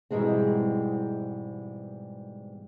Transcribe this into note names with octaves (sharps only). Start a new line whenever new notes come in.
G#2 B2 E3 G3 G#3 C4